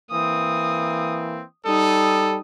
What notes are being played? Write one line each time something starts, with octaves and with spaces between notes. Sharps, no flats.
E3 A#3 C4 D#6
G3 D#4 A4 D#6